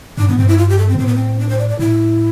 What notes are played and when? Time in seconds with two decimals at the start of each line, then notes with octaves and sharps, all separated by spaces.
0.18 G2 D4
0.28 A2 B3
0.38 G2 C4
0.48 E4
0.58 F4
0.69 G4
0.78 A4
0.89 C4
0.94 B2
0.99 A2 C4
1.07 B3
1.15 C4
1.39 D4
1.49 C5
1.59 D5
1.69 D5
1.79 A2 E4